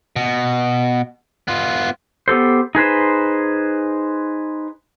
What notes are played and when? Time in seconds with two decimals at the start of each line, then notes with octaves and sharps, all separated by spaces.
0.16 B2
1.48 B3 F4
2.28 B3 G4 A4 C5
2.75 D#4 G#4 B4 C5